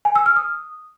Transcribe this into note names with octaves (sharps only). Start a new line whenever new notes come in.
G#5
E6
F6
D#6